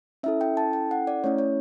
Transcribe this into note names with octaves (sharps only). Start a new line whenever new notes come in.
C#4 E4 A4 E5
G5
A5
G5
F#5
D5
A3 C#4 E4 C#5
C#5